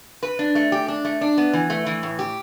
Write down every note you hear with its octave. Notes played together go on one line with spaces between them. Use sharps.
B4
D4
A3
G4
D4
A3
D4
B3
E3
A3
E3
A2
G4